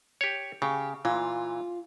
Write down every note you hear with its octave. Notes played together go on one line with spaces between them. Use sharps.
G4 C#5
C#3 G4
A#2 E3 F4